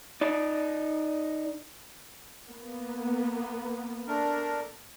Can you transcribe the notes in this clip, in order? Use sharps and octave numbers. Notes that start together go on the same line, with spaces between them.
D#4 D5
A#3 B3
A3 D4 A#4